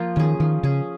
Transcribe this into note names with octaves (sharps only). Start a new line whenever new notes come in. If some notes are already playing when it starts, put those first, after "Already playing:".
Already playing: F3 A#3 F4 A#4
D#3 C#4 G#4
D#3 F3
C#3 C#4 G#4